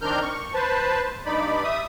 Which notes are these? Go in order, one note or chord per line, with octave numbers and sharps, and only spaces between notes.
D#3 C4 D4 A#4 F6 G6
C#6
B4 C5 A5
G2 D#4 D5 B5
E5 D#6